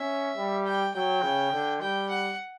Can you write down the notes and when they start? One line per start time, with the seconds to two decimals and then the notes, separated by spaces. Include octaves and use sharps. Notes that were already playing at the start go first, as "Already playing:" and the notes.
Already playing: C#4 E5
0.37 G3
0.66 G5
0.94 F#3 G5
1.23 C#3
1.52 D3
1.81 G3 G5
2.09 F#5